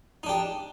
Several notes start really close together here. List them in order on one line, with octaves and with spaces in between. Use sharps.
D#4 D4 G4